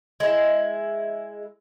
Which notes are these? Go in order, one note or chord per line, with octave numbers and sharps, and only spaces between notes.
G#3 E4